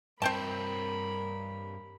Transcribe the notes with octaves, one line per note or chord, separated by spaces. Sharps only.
G2 C4 A#4 C5 G5 A5 B5